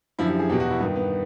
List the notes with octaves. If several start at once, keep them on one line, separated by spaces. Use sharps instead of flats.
F#2 D3 F3 E4
G4
G#4
E2 B2 G4
F#4
E4
G2 D#3 B3
B3